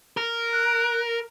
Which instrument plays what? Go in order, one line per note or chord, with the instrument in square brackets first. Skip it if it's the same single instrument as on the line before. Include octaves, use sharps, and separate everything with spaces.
[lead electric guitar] A#4
[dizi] F#6